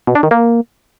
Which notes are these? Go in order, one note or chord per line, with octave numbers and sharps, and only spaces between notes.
B2
D4
D#3
A#3